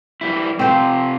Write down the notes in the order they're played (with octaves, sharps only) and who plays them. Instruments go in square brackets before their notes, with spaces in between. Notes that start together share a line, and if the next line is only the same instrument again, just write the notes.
[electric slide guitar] E3 G3 E4
[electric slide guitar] C3 F4 [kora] C4 C5